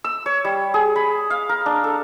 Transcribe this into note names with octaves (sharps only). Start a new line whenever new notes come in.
E6
C#5
G3
G#4
B5
F5
A#4
D4
A4